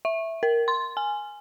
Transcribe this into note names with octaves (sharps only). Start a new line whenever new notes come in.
E5
A#4
C6
G#5